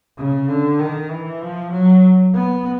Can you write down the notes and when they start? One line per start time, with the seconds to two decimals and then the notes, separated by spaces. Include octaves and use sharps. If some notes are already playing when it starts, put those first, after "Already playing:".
0.18 C#3
0.48 D3
0.80 D#3
1.11 E3
1.42 F3
1.73 F#3
2.34 B3